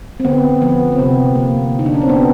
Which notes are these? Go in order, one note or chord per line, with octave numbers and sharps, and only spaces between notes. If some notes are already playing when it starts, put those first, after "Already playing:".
C4
D3 B3
F3 B3
C4
C3 B3
D3 A#3
D3
D#4
D4
C#4
C4
A3 B3